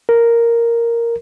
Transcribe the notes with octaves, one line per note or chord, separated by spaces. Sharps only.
A#4